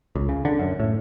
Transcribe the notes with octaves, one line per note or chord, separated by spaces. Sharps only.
C#2
C#3
D3
F#2
A2